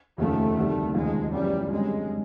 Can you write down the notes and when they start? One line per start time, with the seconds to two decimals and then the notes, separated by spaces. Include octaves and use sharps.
0.18 F1 D#2 C#3 F3 A3
0.57 D2 C3 D#3 G3
0.94 F1 D#2 C#3 F3 G#3
1.32 G1 F#2 C#3 E3 G3
1.70 F#2 D3 G3 G#3 C4